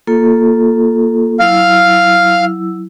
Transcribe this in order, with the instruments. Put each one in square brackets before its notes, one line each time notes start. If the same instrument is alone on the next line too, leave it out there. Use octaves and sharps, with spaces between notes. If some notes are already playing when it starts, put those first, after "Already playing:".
[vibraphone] A#3 F4 A4
[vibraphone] F#3 E4 E6 [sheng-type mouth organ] F5 F6